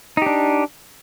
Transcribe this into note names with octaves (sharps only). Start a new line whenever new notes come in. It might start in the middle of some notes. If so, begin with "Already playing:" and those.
D4 D#4 G4